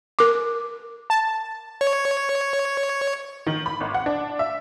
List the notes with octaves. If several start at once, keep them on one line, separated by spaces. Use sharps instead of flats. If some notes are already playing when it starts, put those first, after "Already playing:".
A#4 D6
A5
C#5
D#3
B5
G#1
F#5
D4
E5